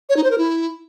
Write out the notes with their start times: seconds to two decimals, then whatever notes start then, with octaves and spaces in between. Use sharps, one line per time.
0.09 C#5
0.16 D#4
0.24 C5
0.31 A#4
0.38 E4